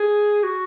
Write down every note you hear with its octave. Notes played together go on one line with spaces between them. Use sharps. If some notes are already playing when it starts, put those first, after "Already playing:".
Already playing: G#4
F#4